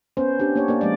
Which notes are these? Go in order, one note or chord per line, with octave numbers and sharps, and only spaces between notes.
B3 C#4 B4 C5
D4 G4
A#3 G4 C#5
A#3 A#4 D5
F3 G#3 C#5 D5